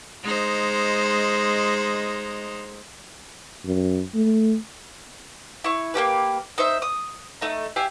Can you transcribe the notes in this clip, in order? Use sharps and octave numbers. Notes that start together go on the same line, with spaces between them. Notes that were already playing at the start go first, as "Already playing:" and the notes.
G#3 D#4 C5
F#2
A3
E4 C#6
A#3 C#4 G4 B4
D#4 C5 E5
D#6
A3 D#4
G4 E5 F5 G#5